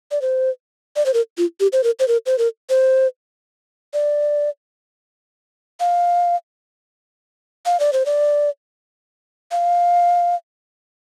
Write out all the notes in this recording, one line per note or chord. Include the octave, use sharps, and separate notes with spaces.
D5
C5
D5
C5
A#4
F4
G4
C5
A#4
C5
A#4
C5
A#4
C5
D5
F5
F5
D5
C5
D5
F5